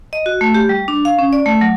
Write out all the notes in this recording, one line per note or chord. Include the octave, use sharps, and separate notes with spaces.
D#5
F#4
A3
G4
G3
D4
F5
C#4
D5
A3
F#3